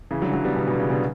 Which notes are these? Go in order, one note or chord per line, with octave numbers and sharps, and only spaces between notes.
C#3 E3
D3 F#3
D3 F#3
G3 B3
B2 D3
B2
C#3
B2 D3